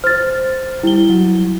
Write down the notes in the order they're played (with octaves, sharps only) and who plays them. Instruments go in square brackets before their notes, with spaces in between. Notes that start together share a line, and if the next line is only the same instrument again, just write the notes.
[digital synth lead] C5 [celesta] F6 A6
[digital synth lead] G3 [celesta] E4 G7
[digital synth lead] F#3